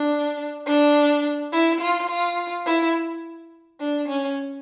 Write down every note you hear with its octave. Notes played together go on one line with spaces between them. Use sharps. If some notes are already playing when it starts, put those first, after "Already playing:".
Already playing: D4
D4
E4
F4
F4
E4
D4
C#4